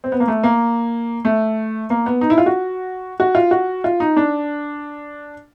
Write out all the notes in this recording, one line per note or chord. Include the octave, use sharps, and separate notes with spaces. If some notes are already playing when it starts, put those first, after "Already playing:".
C4
B3
A#3
A3
A#3
A3
A#3
B3
D#4
E4
F4
F#4
F#4
F4
F#4
F4
D#4
D4